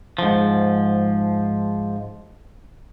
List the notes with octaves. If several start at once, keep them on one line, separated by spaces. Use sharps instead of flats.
G#2 F3